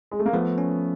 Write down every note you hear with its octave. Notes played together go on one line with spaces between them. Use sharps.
G#3
A3
A#3
F3 A3 B3
C#4